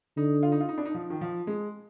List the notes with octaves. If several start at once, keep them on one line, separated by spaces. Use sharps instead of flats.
D3 D#4
F4
D#4
F4
D#4
D4
D#4
F3
D#3
F3
G#3